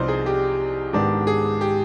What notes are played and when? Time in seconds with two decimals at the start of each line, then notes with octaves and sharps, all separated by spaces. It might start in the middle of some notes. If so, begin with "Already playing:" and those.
Already playing: C2 C3 F3 B3 D#4 C5 D5
0.08 G#4
0.26 G4
0.93 G#2 D#3 B3 D4 G4
1.27 G#4
1.61 G4